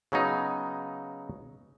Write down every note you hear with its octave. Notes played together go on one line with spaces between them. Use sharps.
C#3 F#3 B3 D#4